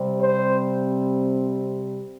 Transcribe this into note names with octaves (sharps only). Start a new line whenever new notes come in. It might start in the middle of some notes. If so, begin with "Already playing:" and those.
Already playing: C3 G3 C4
C5